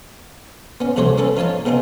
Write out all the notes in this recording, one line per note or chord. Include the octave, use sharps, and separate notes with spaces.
B3 C#4
C2 C3 A3 F#4 C5 C#5
C4 C#4 A4 B4
F3 D#4 C#5 F5 A5
C#3 B3 C4 D#4 G#4